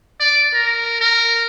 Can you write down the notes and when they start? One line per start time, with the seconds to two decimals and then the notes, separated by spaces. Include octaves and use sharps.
0.20 D5
0.53 A#4
1.01 A#4